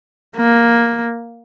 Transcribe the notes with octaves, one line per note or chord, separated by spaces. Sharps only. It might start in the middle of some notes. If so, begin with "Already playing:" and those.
A#3